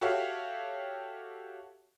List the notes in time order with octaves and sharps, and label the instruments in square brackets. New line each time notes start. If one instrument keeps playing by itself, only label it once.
[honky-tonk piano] F#4 G4 A4 C#5 E5 F5